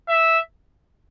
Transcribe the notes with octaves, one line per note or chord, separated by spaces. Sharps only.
E5